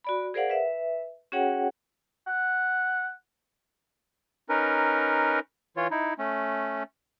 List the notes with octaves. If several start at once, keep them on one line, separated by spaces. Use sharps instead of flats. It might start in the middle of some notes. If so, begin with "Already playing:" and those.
F#4 D5 B5
G#4 A#4 C5 D5 F5 F#5
B4 E5
C#4 F#4 G#4 C#5 F#5 G5
F#5
C#4 D#4 A#4 B4
E3 F4 C#5
D#4 E4
A3 C#4